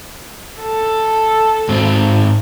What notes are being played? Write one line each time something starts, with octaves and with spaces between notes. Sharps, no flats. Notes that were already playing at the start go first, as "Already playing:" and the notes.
A4
G#2 C4